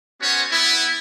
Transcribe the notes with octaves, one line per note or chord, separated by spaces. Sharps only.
B3 C#4 F#4 C5 C#5
B3 E4